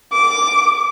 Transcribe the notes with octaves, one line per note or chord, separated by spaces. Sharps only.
D6